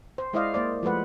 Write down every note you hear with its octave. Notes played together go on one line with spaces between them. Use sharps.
C5
G#3 E4 C5 D5 D#5 F5
A#3 C5 D5
F3 G#3 A3 B4 F#5